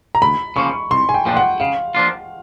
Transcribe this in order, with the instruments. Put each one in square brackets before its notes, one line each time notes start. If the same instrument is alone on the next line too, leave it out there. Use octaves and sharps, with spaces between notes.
[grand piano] A#5
[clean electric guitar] D2 [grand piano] B5
[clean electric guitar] C#3 F3 A#3 C#4 [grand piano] C#6
[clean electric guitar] C2 [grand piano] C6
[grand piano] G#5
G5
[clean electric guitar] A#2 F3 A3 D4 [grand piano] G5
[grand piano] F#5
[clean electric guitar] C#3 [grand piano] F5
[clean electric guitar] F3 A#3 D4 F4